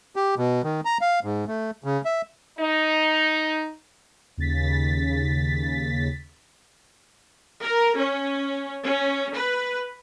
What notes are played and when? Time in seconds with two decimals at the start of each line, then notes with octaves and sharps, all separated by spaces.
0.16 G4
0.37 B2
0.64 D#3
0.85 A#5
1.01 F5
1.24 G#2
1.47 A3
1.84 C#3
2.05 E5
2.59 D#4
4.38 D#2 C#3 A6 B6
7.62 A#4
7.96 C#4
8.84 C#4
9.35 B4